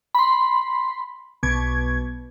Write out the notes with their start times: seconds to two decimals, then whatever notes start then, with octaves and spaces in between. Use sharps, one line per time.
0.15 B5 C6
1.43 B1 B2 G#6